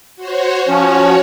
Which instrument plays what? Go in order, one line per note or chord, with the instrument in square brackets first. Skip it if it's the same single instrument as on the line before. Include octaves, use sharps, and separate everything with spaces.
[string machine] F#4 C5 C#5
[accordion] F3 C#4 [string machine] F#4 C#5